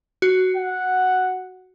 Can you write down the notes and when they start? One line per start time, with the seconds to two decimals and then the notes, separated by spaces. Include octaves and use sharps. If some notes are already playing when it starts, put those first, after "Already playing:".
0.22 F#4
0.57 F#5